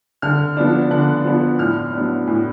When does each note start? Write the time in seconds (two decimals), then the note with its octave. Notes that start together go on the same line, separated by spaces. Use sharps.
0.22 D3 F6
0.57 F3 B3 D4
0.91 D3 F#6
1.25 F3 B3 D4
1.59 A2 F6
1.93 F#3 B3 D4
2.27 A2